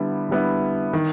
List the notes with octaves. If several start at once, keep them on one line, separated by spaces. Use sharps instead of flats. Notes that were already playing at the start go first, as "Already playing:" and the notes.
Already playing: D3 G3 B3 E4
D3 G3 B3 E4
D#3